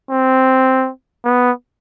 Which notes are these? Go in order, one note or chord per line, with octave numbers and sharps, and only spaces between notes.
C4
B3